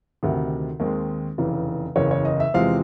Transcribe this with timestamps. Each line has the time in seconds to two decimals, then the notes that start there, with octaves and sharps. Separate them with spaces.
0.23 D2 C3 D#3
0.80 D#2 D#3 G#3 C4
1.38 F1 E2 C#3 E3
1.96 F#1 E2 C#3 C#5
2.11 C#5
2.25 D#5
2.40 E5
2.54 E2 C3 F3 G#3 C4 F5